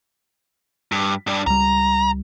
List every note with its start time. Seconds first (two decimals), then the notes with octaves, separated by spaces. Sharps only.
0.92 G2
1.27 G2 D4
1.47 C#2 G3 A#5